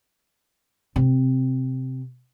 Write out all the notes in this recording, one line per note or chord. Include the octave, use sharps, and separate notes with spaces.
C3 C4